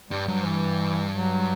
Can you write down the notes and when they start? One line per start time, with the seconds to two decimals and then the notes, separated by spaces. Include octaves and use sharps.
0.10 G2 G3
0.28 G2 F#3
0.45 E3
1.14 F#3